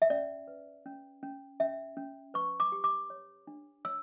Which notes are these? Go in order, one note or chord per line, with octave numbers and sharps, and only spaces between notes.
E5
C#4 D5
B4
C#4
C#4
C#4 E5
C#4
B4 C#6
D6
G4
D6
C#5
D4
C#5 E6